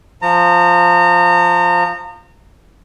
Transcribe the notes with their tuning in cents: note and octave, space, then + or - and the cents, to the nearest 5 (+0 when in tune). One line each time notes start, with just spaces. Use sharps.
F3 +0 A#5 -30